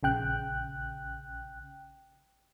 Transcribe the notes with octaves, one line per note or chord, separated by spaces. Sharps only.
A#1 C#3 G5 F#6